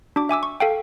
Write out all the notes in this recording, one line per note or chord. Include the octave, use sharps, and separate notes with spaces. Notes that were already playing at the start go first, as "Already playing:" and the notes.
D4 F#4 D6
E5 G#5 D6 E6
C#6
A4 F5 G5